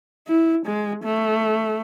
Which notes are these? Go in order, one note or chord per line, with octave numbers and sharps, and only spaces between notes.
E4
G#3
A3